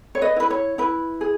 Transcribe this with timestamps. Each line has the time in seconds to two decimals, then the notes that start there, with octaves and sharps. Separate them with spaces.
0.15 C#5
0.21 B4 D#5
0.36 E4 B4
0.50 C#5
0.78 E4 B4
1.21 G#4